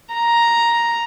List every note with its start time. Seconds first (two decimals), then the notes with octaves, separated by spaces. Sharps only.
0.14 A#5